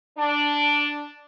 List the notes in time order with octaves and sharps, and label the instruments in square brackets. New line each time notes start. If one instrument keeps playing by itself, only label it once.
[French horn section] D4